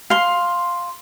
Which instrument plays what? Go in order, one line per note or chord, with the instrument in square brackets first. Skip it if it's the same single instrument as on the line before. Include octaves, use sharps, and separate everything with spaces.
[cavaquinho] F5 C6